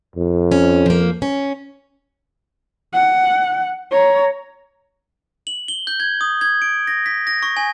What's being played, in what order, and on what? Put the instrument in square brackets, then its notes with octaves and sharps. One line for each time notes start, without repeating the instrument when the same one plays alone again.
[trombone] F2
[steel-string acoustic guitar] C#4
F3 A#3
C#4
[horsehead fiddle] F#5
C#5 A#5
[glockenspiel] F#7
G7
G6
G#6
D#6
G#6
D7
A#6
B6
A#6
C#6
G#5